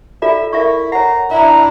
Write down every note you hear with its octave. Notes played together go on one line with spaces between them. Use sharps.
F4 A4 D5 E5
E4 A#4 E5 C#6
C#5 F#5 A#5
D4 E4 E5 A#5